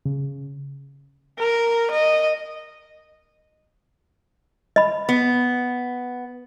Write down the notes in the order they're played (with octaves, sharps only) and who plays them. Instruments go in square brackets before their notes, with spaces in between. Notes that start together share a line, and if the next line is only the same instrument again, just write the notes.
[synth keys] C#3
[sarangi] A#4
D#5
[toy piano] D#5 B5
[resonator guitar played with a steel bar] B3